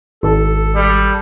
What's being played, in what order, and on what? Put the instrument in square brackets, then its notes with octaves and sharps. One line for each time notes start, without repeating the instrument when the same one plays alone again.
[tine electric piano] G#1 [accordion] A4
[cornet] G3